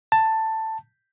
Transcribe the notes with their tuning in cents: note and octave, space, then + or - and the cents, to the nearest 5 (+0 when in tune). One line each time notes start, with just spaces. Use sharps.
A5 +10